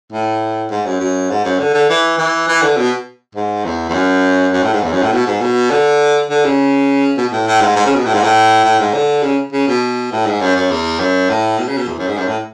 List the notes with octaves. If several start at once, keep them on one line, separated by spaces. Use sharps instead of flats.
A2
G#2
F#2
F#2
G#2
F#2
D3
D3
E3
E3
E3
D3
B2
G#2
E2
E2
F#2
F#2
A2
G#2
E2
F#2
A2
B2
G#2
B2
D3
D3
C#3
B2
B2
A2
A2
G#2
G#2
C#3
B2
A2
G#2
A2
A2
G#2
D3
C#3
C#3
B2
A2
G#2
F#2
F#2
E2
F#2
A2
B2
C#3
B2
E2
F#2
G#2
F#2
A2